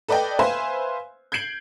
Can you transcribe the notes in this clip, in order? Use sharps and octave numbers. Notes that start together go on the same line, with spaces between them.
A4 B4 D5 D#5 G5
B4 C5 E5 F5 G#5 C6
G6 G#6 C7 D7 F#7